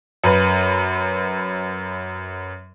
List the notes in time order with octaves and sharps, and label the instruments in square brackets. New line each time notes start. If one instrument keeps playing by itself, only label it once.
[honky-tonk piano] F#2 B4